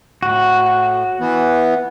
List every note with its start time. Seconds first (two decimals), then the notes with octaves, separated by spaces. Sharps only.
0.23 A2 F#4
1.20 E3 B3